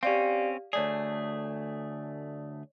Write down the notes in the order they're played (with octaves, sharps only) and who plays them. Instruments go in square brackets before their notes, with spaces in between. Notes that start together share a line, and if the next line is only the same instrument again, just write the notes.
[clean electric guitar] C4 C#4 [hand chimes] G4 D5 F5
[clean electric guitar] D2 A3 G#4 [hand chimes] C#5 D5